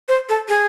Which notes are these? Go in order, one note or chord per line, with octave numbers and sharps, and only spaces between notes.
C5
A4
G#4